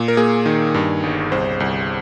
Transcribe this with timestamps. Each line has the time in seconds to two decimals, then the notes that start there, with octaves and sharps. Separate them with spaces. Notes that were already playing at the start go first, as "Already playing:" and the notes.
Already playing: A#2
0.08 A#4
0.17 A#3 G#4
0.46 D#3
0.74 G2
1.03 G1
1.32 C2 C5
1.60 C2